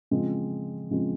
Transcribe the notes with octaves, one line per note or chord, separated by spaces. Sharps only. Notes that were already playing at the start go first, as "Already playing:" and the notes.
C#3 F3 G#3 C4
C#3 F3 G#3 C4